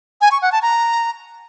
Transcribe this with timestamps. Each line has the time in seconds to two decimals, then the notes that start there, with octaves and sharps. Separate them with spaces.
0.21 G#5
0.31 C#6
0.42 F#5
0.52 A5
0.62 A#5